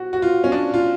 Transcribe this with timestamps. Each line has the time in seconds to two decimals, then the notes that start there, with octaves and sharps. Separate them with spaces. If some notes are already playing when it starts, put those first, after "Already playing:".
Already playing: F#4
0.13 F#4
0.22 F4
0.44 C#4
0.52 D4
0.74 F4